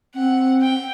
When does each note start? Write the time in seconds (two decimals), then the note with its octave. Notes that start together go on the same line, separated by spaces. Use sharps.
0.15 C4 F#5
0.62 G5